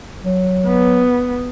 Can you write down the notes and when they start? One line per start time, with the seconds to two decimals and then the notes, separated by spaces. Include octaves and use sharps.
0.22 F#3
0.67 B3